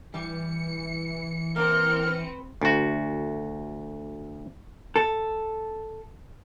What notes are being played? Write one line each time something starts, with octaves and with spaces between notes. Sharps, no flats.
E3 G3 C#7
A#3 C4 A#4 F6 C#7
B4
D2 F#4
A4